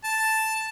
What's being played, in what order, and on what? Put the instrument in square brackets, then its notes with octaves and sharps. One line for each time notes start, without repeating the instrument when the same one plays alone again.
[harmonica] A5